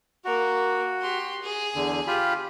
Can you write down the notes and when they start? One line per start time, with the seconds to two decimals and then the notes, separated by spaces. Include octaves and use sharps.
0.25 A#3 F#4 A#4
1.01 G4 C6
1.42 G#4
1.75 E2 D3
2.07 F4 G4 B5